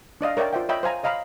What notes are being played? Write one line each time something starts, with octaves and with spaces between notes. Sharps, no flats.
D4 D5 D#5 F5
A#4 C#5 D5 E5 G5
F4 C5 D5 E5 F#5 G5
C#5 D#5 E5 G5 B5
C5 F5 G#5 A#5
C#5 D#5 F5 A#5 B5